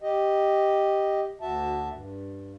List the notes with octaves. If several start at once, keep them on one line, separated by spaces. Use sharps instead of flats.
G4 D#5
D2 F#4 E5 A5
G2